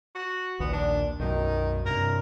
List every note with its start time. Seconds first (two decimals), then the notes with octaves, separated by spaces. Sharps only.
0.15 F#4
0.60 A#1 D#2 A#2 B3
0.73 D4
1.19 B1 F#2 D#3
1.86 G2 C3 A#4